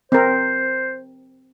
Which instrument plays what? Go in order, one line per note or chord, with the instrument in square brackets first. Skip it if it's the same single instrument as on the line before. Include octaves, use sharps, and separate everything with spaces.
[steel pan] C4 A#4 [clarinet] C5